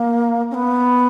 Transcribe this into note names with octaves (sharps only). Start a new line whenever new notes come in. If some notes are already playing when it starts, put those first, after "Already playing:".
Already playing: A#3
C#4
B3